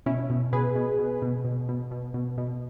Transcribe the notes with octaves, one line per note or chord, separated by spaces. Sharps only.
B2 C#4 E4
B2
B2 G#4 B4
B2
B2
B2
B2
B2
B2
B2
B2